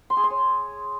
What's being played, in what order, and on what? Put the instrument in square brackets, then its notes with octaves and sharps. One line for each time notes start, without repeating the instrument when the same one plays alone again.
[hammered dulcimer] C6
G#4
C6
C#5